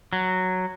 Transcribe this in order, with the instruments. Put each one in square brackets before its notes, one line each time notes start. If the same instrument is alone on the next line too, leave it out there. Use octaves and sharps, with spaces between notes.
[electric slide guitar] F#3